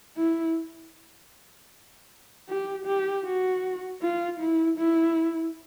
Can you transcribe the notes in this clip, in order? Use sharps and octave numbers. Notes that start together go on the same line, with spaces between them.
E4
G4
G4
F#4
F4
E4
E4